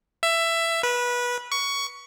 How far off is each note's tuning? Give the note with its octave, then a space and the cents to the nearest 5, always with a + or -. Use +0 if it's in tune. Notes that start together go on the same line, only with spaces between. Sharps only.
E5 +15
B4 -20
C#6 +15